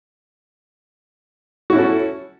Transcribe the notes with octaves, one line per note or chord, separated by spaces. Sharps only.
C#4 E4 F#4 A4